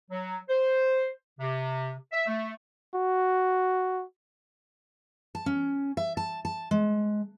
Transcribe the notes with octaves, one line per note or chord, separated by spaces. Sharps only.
F#3
C5
C3
E5
A3
F#4
A5
C#4
E5
A5
A5
G#3